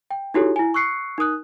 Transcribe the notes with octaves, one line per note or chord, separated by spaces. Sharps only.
G5
D#4 E4 F#4 G4 A4 C#5
E4 G#5
C#6 E6 F#6 C7 C#7
D#4 A#4 D#6 F#6